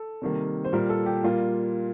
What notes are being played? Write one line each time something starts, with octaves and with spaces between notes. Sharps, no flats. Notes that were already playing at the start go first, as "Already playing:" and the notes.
Already playing: A4
C3 D#3 G3 A#3
C5
A#2 G3 A#3 A#4
A4
G4
A#2 G3 A#3 F4